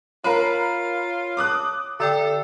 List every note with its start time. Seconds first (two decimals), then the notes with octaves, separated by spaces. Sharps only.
0.24 F4 A#4 C#5 F5 B5
1.37 D6 D#6 F#6
2.00 D3 A4 D5 G5